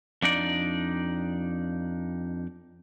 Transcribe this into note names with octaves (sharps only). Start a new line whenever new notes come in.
F2 D4 D#4 D5